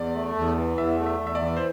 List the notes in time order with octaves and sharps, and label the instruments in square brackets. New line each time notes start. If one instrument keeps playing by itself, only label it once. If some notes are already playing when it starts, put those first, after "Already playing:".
Already playing: [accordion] E2 [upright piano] D5
[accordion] A3
E2
E3
[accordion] E2 [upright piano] E5
[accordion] A3
[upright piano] E5
[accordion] E2
[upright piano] E5
D5
[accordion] E3
[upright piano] C5